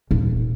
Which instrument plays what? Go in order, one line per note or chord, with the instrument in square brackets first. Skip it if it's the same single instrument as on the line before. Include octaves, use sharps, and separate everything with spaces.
[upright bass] D#1